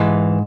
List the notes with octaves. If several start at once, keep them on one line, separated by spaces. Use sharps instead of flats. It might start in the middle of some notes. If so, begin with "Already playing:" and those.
Already playing: G#2 E3